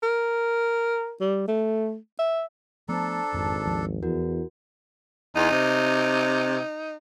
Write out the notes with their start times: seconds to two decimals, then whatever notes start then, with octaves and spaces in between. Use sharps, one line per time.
0.03 A#4
1.20 G3
1.48 A3
2.19 E5
2.89 F3 A3 B3 D4 A4 C5 A#5
3.34 G#1 F2
3.66 D#2 F3
4.03 E2 E4 F#4 A#4
5.36 E2 D#4
5.51 C3